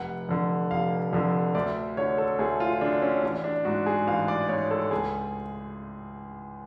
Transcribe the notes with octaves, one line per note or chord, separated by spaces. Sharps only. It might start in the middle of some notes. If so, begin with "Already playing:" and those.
Already playing: F1 F#5
F2 D3
F1 F5
F2 D3
D2 D5
D3 C#5
A4
D2 G#4
F4
D3 D4
C#4
A1 D4
D4
G#2 F#4
G#4
A1 F5
D5
G#2 C#5
A4
C#2 G#4